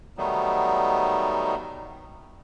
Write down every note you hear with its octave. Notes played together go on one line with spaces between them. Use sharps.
D#3 F#3 G3 A3 B3 D#4